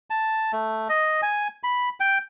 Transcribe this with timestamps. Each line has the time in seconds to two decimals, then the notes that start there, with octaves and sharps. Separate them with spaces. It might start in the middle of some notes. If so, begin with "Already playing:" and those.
0.10 A5
0.52 A3
0.89 D#5
1.22 G#5
1.63 B5
2.00 G5